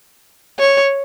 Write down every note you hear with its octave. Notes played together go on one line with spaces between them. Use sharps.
C#5